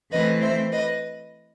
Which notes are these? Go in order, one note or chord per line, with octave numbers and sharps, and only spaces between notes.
E3 A3 C4 B4 D#5
C5 E5
B4 D#5